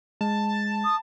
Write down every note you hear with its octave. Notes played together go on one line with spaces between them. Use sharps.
G#3 A5
D#6